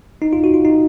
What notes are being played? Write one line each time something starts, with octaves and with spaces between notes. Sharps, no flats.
D#4
F4
F#4
F4
D#4